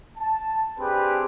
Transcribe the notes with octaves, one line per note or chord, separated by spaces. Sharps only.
A5
C4 D4 G4 G#4 B4